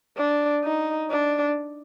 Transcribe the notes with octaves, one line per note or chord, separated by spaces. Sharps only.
D4
D#4
D4